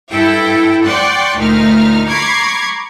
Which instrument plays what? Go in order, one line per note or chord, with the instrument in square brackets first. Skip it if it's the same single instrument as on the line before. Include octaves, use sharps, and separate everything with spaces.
[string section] G2 E4 A4 G5
D5 F#5 G5 C6 C#6
D2 A#2 A3 D#4 F6
A#5 B5 C#6 D6 G#6 C7